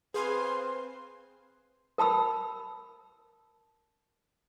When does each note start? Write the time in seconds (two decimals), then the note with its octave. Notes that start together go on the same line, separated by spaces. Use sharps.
0.14 C4 G#4 B4 C5 F5 G#5 C6
1.98 A#4 A5 B5 E6